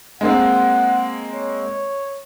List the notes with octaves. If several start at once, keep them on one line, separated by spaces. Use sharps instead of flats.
G#3 A#3 C4 F#5
C#5